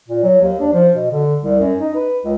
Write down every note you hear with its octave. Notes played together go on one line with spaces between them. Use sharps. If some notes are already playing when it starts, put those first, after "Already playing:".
A#2
F#3
D#2
D4
F3
B2
D3
C2
F#2
D#4
B4
C#2